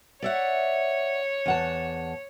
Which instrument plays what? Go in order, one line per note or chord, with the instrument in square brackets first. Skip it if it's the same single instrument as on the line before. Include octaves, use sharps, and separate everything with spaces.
[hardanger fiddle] C#5 [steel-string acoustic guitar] D5 E5 F#5
[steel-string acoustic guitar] E2 F#5 A5